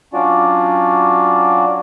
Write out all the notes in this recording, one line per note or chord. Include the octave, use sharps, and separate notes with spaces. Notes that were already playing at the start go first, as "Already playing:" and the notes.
F#3 C#4 D4 F4 F#4 D5